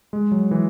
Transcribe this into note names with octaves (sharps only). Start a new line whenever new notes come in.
G#3
F#3
E3